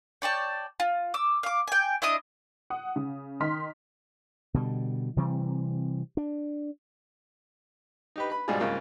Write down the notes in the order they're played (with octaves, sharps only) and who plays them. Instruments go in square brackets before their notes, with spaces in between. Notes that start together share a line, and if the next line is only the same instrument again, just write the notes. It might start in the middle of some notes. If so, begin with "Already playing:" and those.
[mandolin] C#5 D5 G5 A5
F4
D6 E6
F5 D6
G5 G#5
D4 E4 D#5 D#6
[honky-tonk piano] F#5 D#6
C#3
D#3 D#4 C6 F6 B6
[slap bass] B2 D3 G3
C3 E3 G3 C4
D4
[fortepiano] D#4 G4 B4
B4 B5
G#2 B2 G3 D4 F4 G#4
C2 G#2 C#3 A#3 F4